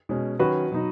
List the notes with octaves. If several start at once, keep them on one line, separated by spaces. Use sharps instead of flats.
B2 G#3 C#4
D#3 F#3 C#4 F#4 B4
B2 F#3 D#4